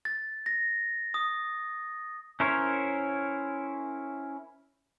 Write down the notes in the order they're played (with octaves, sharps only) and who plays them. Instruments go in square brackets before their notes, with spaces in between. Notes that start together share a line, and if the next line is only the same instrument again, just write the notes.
[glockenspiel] A6
A#6
D#6
[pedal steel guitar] C#4 E4 A#4 C5 C#5